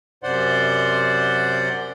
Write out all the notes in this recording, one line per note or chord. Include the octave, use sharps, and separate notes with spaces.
F#2 C3 C5 D5 F#5 C6